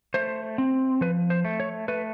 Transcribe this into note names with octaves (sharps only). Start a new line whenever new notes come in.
A3 C5
C4
F3 B4
C5
A3
C#5
A3 B4